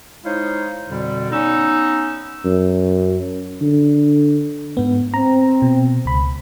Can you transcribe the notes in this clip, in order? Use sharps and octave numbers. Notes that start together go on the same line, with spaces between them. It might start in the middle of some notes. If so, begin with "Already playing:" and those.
G#3 D#4 E4 C5 C#5 F5
F2 B2 D3 G3
B3 C#4 D#4 E6
F#2
D3
G#2 B3
C4 A#5
B2
C#2 B5